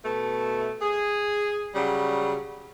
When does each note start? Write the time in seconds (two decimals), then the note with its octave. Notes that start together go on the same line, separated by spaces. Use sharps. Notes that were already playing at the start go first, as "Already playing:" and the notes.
0.05 B2 A3
0.82 G#4
1.75 C#3 F#3 G3